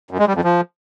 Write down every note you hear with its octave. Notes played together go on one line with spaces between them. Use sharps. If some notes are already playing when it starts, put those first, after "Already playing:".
F#2
G#3
G3
F2
F3